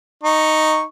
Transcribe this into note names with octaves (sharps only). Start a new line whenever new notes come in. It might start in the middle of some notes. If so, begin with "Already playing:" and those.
D#4 C#6